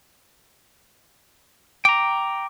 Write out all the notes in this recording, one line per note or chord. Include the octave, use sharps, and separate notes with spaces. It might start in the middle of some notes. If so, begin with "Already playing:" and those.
G5 A#5 D6